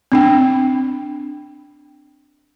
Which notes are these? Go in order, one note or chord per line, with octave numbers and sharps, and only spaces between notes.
C4 D4 G5